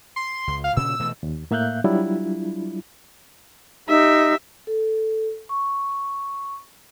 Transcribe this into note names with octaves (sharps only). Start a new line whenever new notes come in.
C6
C#2
F5
A#2 C#3 C#4 E6
B2 E3 A3
D#2
A2 A#3 E5 F5 F#6 G6
F#3 G3 D4 E4 F4
D#4 G4 E5
A4
C#6